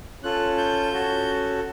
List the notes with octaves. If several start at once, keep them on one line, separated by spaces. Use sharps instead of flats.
C#4 F4 A4 F#6
G6
C#4 F#4 A4